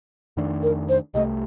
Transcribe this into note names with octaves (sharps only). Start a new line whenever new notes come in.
F2 D#3 A3 D4
A#4
C5
C2 C3 D#3 A3 D#5